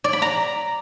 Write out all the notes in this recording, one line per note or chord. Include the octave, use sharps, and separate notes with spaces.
D5
B5
A#5